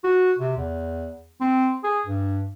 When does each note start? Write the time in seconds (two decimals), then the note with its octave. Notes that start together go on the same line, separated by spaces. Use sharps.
0.04 F#4
0.39 C3
0.57 E2
1.40 C4
1.84 G#4
2.06 G2